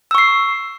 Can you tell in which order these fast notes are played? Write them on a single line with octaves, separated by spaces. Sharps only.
E6 C#6 C7